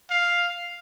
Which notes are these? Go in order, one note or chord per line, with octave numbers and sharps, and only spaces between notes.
F5